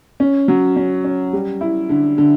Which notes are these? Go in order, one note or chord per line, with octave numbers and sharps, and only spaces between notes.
C#4
F#3
C#4
C#4
G3
E4
D3
D3